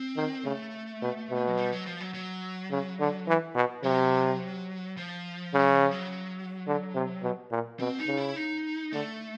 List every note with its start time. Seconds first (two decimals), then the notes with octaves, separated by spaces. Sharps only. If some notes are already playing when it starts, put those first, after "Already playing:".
Already playing: C4
0.17 D#3
0.44 C#3 A3
1.01 B2
1.30 B2
1.47 F#3
1.58 G3
1.72 F#3
1.86 F3
2.01 F#3
2.14 F#3
2.71 C#3
2.99 D3
3.28 E3
3.55 B2
3.84 C3 F#3
4.97 F3
5.54 C#3 F#3
5.72 F3
5.91 F#3
6.67 D3
6.94 C3
7.22 B2
7.51 A#2
7.79 B2 C4
7.99 D#4
8.07 C#3
8.17 E4
8.36 D#4
8.92 D3 A3